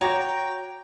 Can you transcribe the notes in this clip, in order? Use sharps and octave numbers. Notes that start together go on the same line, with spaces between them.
F#4 C#5 G5 A#5 D6 A#6